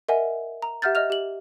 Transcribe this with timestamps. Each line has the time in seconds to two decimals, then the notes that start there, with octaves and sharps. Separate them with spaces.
0.09 A#4 D#5 E5 F#5 G#5
0.62 A#5
0.82 G4 E5 F#5 F6 G6 A6
0.95 D#5 E5 F6 F7
1.10 G4 F#7